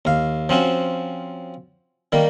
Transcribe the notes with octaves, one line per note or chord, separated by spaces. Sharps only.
D#2 F5
F3 C4 C#4 F#4
D#3 G3 A#3